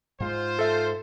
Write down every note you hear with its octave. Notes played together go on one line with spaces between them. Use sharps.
G#2 G#3 F4 C5
A4 E5